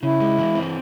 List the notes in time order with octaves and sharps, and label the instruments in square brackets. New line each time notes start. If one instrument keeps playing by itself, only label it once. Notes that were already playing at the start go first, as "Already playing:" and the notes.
[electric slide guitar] C#3 [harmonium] E4
[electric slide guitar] G#3
E3
C4